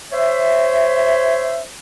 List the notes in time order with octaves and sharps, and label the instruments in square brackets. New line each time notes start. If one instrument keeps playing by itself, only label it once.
[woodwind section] C5 C#5 E5